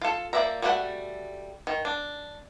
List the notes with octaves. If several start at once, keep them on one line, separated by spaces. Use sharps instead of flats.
F4 A4
F3 A#3 D5 E5 A#5
G3 A3 F#4 A#4 F#5
D#3
D4